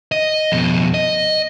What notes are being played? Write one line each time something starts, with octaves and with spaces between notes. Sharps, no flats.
D#5
F2 B2
D#5